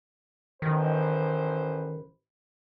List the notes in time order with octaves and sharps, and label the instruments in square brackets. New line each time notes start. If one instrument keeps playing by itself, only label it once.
[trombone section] A1 B4 C5 [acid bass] D#3